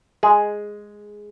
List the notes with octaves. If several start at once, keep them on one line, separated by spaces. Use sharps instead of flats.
G#3 G#4